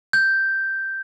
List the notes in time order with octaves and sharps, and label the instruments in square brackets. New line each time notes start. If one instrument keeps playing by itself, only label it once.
[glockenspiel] G6